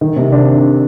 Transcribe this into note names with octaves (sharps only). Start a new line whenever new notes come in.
D#3
C3
D4